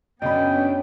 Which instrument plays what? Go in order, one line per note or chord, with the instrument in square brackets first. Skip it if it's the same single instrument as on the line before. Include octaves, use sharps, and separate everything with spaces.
[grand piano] F#2 C#3 B5 [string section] B3 C#4 D4 [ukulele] D#5 [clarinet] G5